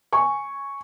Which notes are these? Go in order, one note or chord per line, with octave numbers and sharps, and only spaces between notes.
G#5 C#6